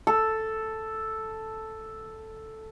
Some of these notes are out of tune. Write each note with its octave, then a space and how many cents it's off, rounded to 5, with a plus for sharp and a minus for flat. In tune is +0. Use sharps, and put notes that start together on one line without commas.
A4 +0